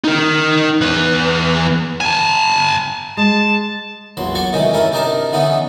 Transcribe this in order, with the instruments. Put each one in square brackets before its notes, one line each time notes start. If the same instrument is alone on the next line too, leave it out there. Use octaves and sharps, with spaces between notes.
[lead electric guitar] D#4 A#4
E2 B4
G#5 A5
[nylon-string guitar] G#3 [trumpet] A5
[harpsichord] A#1 E2 F#3 C6
F#3 F#4 D5 C#6
C3 D#3 E3 G#3 A3 C#4
G2 A3 C#4 E4 A#4
C3 D4 D#4 A#4 A5 D6
D3 E3 B3 C#4 D#4 E4